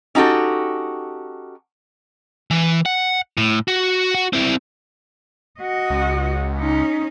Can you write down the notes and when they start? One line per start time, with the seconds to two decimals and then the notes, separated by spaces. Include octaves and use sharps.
0.15 C#4 D#4 F#4 G4 A4
2.51 E3
2.86 F#5
3.37 A2
3.68 F#4
4.15 F#4
4.33 C4 E4
5.60 F#4 D#5
5.90 C#2
6.56 C#4 D#4